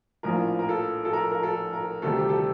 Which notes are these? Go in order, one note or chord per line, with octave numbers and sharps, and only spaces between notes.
A#1 A2 F3 A#4
A#4
A4
A4
A#4
A#4
A4
A#4
D2 C3 D#3 G3 A4
G4
A4